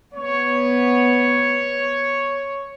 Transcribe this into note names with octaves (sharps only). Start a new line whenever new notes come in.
B3 C#5